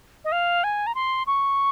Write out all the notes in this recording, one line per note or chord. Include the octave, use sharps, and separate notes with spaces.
D#5
F5
G#5
A#5
C6
C#6